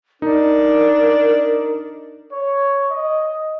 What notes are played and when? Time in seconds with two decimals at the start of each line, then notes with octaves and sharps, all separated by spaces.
0.22 D4 D#4 A#4
2.31 C#5
2.89 D#5